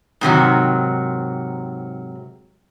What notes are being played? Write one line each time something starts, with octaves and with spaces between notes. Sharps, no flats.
G#2 C3 D#3 F#3